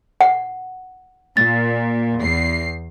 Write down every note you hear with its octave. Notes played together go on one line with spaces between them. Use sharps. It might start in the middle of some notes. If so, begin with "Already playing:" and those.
F#5
A#2 A6
E2 C7